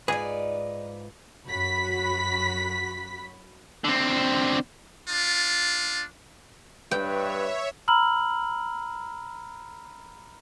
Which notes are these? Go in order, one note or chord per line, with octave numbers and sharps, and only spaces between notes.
G#2 D#4 F4 G#4 B4 D5
F#2 F#4 B5 B6
D3 C4
D4 F4
G2 B4 C#5 E5 G5
A#5 B5 E6 F6 F#7